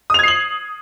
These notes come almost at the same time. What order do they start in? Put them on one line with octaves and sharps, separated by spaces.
D#6 F7 G#6 C7 F#7